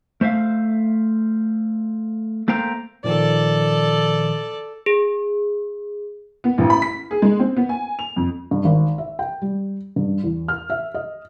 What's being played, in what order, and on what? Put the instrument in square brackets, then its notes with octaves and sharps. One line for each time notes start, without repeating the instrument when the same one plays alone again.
[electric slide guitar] A3 C5 E5 F5
A3 A#3 C5 G5 A#5
[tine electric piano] A#2 D#3 F3 [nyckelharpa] A4 D5
[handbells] G#4
[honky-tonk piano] B3
A1
B5
B6
G#4
G#3
C4
B3
G#5
F7
F2
[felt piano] G2
G#1
E5
G5
G3
G2
E2
F6
E5
D#5